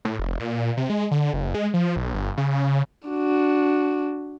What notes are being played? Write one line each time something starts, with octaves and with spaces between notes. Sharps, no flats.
A2
F1
A#2
C3
G#3
D3
F#1
G#3
F3
B1
G1
C#3
D4 F#4